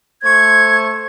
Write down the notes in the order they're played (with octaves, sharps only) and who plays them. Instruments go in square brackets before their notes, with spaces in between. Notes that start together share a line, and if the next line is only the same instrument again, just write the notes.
[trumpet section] A3 C5 C#6 [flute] G#6